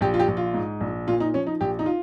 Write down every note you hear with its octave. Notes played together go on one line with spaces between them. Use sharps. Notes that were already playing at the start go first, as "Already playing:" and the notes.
A#1 G4
F4
G4
A#1
F4
G#2
A#1
A#2 F4
D#4
F3 C#4
D#4
A#1 G4
D#4
F4